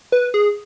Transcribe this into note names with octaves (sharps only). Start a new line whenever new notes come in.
B4
G#4